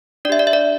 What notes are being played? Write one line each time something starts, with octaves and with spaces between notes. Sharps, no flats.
D4 G4 D5 E5
D5
E5
D5